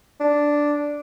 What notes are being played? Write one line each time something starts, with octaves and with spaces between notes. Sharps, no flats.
D4